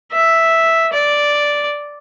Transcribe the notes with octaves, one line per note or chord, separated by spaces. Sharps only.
E5
D5